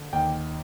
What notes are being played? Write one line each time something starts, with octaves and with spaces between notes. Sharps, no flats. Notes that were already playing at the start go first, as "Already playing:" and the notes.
Already playing: D3
D#2 G5